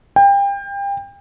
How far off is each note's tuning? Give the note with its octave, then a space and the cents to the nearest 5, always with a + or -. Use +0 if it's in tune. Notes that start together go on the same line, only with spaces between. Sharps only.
G5 +30